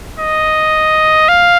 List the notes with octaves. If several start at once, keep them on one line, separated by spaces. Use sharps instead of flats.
D#5
F5